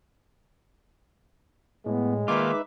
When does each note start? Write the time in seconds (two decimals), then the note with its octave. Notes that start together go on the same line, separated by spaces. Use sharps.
1.86 A2 G#3 B3
2.28 D#3 A#3 D#4 F4 B4 E5 D6